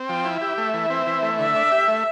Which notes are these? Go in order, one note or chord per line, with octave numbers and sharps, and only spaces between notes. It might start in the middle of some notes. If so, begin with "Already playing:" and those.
Already playing: C4
F3 G5
E4
G4 E5
A3
E3
C4
E3
A3
D3 E5
D4
G4
A3